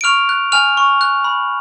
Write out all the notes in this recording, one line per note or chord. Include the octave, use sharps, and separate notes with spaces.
D7
C#6 F6 F7
F#6
G#5 F6 F7
C#6
F#6
B5